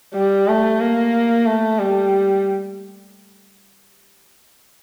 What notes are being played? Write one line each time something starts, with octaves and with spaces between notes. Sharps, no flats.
G3
A3
A#3
A3
G3